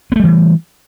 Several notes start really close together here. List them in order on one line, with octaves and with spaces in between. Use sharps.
B3 A3 G3 E3